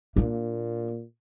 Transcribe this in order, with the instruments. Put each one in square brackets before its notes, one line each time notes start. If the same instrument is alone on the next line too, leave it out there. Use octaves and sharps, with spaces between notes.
[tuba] A#2 [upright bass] A#3 D4